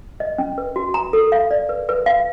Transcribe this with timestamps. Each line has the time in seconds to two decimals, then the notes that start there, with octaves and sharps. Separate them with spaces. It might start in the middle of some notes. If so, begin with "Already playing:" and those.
0.20 D#5
0.38 C#4
0.58 B4
0.76 F#4
0.94 A#5
1.13 A4
1.32 F5
1.51 D5
1.69 B4
1.89 B4
2.06 F5